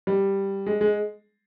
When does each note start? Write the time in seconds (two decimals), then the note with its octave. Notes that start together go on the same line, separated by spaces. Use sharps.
0.07 G3
0.66 G#3
0.81 G#3